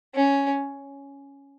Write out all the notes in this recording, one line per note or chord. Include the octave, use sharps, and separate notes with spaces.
C#4